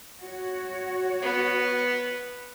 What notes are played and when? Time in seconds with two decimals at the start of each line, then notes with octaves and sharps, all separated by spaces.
0.21 F#4 C#5
1.22 B3